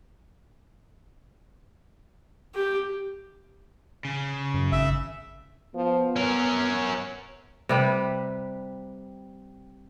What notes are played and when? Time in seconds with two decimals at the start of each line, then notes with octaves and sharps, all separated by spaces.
2.55 G4
4.05 C#3
4.54 F#2
4.72 G#1 E5
5.75 F3 B3
6.16 C#4 A#4 C#5
7.69 C3 G3 B4